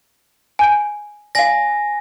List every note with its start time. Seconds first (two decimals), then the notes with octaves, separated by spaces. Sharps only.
0.59 G#5 G6 D7
1.35 D5 F5 G#5 A#6